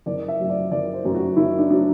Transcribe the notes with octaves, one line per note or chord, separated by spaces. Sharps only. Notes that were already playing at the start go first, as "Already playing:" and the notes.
F#1 D5
E5
F#2 F#3
D5
F#1 D5
C5
F#2 F#3
F#4
F#1 E4
D4
F#3 D4